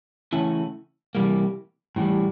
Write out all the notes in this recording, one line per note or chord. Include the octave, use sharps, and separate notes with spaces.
C#3 E3 A3 C#4 E4
C3 E3 G3 A#3
A2 E3 G3